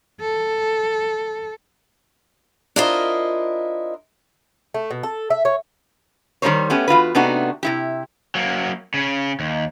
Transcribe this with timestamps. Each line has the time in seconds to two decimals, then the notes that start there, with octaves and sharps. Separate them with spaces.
0.21 A4
2.76 D4 E4 F4 A#4 C5 D#5
4.74 A3
4.91 B2
5.03 A4
5.30 E5
5.45 C#5
6.42 D#3 G3 A#3 A#4 C5 C#5
6.70 A3 B3 C#4 G4
6.88 E2 F4 F#4 B4
7.15 C3 A3 B3 D4 D#4 F#4
7.63 C3 E4 G4
8.35 F#3 A#3
8.94 C#3 C#4
9.40 D#2